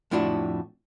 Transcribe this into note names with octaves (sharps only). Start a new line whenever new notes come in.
F2 A2 D4 E4 F#4